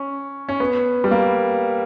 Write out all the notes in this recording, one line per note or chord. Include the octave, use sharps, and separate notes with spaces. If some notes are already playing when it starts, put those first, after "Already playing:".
Already playing: C#4
C#4
B3
G3
A#3